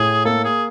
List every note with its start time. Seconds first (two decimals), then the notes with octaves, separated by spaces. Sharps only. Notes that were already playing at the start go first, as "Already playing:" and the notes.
Already playing: A2 G#4
0.25 A#3 A4
0.45 G#4